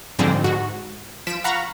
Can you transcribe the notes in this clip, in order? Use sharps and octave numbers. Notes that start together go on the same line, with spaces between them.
G#2 D3 F3 G3 G#3 C4
G#2 F#4
F3 B6 D7 E7
F5 F#5 A#5 B5 C#6